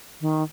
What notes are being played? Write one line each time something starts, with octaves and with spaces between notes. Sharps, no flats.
D#3